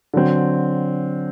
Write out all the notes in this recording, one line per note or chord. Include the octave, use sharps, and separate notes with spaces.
D3 F#3 C4